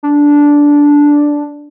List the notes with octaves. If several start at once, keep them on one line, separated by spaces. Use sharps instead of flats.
D4